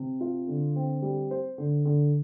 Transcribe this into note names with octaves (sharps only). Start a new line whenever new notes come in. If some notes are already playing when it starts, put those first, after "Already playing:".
Already playing: C3
F4
D3
C4
G3
C5
D3
D3